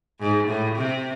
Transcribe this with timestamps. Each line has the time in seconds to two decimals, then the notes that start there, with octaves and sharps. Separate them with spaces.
0.20 G#2
0.48 A2
0.76 C3